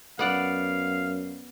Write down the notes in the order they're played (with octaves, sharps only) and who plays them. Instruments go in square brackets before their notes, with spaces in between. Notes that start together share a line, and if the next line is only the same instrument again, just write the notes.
[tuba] F#2 [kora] B3 D5 F#5 [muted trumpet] F5